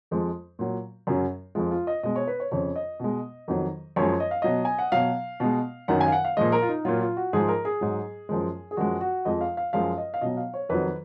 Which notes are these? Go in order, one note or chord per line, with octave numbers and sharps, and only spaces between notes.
F2 F3 G#3
A#2 F#3
F#2 C#3 F#3
F2 F3 G#3 F4
F4
D#5
B2 G#3 D#5
C#5
B4
C#5
F2 C#3 F3 C#5
D#5
B2 G#3
F2 D#3 F#3
F#2 F3 G#3 C#5
D#5
F5
B2 F#3 D#5
G#5
F#5
B2 F#3 F5
B2 G#3
F#2 D#3 F#3 F#5
G#5
F5
F#5
F5
A#2 F3 G#3 D#5
A#4
F4
D#4
A#2 F#3 F4
F4
F#4
G#2 F3 G#3 G#4
A#4
G#4
G#2 F#3
F#2 F3 G#3
G#4
F#2 F3 G#3 F#4
F#4
F2 F3 G#3 D#5
F5
F5
F#2 F3 G#3 F5
D#5
F5
B2 F#3 D#5
F5
C#5
F2 D#3 F#3 B4